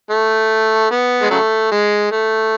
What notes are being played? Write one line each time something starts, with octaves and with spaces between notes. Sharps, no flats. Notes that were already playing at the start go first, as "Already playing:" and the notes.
A3
B3
G#3
C#3 F#3 A3
G#3
A3